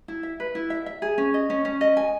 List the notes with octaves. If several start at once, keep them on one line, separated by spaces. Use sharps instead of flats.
E4
E5
B4
E4
E5
E5
G#4
C#4
D#5
C#4
C#4
D#5
G#5